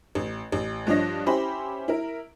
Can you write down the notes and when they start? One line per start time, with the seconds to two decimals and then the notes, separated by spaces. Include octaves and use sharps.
0.15 A1
0.52 A1
0.87 G2 F3 D4 C#5 D#5 A#6
1.26 C#4 E4 G4 C5 B5
1.88 E4 A#4